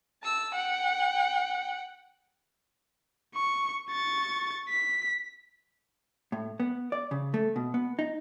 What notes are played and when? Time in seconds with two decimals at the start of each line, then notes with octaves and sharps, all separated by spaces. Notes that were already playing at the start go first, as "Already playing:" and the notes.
0.23 A5 E6
0.54 F#5 G5
3.35 C#6
3.89 C#6 A6
4.69 B6
6.32 A2
6.60 B3
6.92 D5
7.11 C#3
7.34 A3
7.56 B2
7.74 B3
7.99 D#4